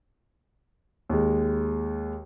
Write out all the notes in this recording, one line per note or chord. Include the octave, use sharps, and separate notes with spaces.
D#2 G#3